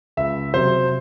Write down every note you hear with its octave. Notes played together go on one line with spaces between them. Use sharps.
C#2 E5
C3 F#3 C5